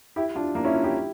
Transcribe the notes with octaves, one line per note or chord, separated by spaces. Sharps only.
E4 G4
D4 F4
A#3 D4
C#4 E4
D4 F4
E4 G4